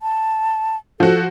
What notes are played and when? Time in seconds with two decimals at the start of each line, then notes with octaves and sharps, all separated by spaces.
0.02 A5
1.00 F3 F#4 A4